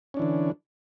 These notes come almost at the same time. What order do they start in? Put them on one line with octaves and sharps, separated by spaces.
C#4 D4 E3 D3